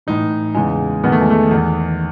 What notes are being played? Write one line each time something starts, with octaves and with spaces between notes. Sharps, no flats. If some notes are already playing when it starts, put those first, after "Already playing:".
A2 E3 D#4
E2 C#3 E3 G#3
E2 D#3 B3
A3
G#3
A3
E2 D#3